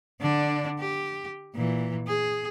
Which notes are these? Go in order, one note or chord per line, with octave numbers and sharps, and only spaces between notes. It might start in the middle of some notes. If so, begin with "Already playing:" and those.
D3 D4
G4
A#2 E3
G#4